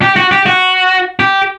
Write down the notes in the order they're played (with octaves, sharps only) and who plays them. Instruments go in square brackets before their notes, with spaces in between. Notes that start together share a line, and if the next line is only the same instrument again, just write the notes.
[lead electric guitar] G4
F#4
G4
F#4
G4